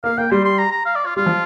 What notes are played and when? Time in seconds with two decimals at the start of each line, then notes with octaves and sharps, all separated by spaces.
0.04 A#3 F5
0.18 A#3 G5
0.31 G3 C6
0.45 C6
0.58 A#5
0.72 A#5
0.86 F5
0.96 D5
1.06 F4
1.16 G3 F4
1.26 F3